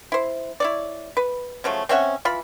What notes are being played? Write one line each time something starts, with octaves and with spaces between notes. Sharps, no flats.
E4 C5
E4 C#5 D5
B4
C#3 F3 F#3 A3
C4 C#4 E5 F#5
E3 F4 B5